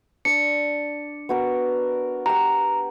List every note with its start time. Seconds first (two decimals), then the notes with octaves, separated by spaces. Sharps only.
0.25 D4 D5 C#7
1.29 B3 F#4 A#4
2.26 G4 F#5 A#5